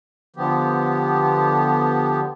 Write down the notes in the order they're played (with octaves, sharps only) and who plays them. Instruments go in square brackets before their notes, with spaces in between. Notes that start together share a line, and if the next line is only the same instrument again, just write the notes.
[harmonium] D3 F3 B3 G4